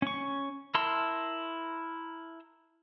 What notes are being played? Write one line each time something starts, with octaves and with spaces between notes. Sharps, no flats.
C#4 C#6
E4 A#4 A5 C6 E6